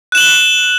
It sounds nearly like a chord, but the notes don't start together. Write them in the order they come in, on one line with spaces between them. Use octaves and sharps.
F#6 E7 F#7 G7